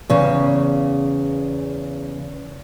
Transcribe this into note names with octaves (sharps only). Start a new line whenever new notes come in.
E2 C#3